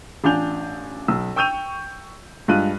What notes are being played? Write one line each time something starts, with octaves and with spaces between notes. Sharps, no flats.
A1 D4 F4 G#5 G6 F7
B1 E6
G5 C#6 E6 G6 D#7 F7
G2 G#3 F4 F#6 D#7